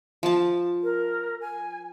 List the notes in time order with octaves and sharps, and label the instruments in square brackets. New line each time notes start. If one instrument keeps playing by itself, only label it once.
[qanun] F3 A5
[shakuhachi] A#4
G#5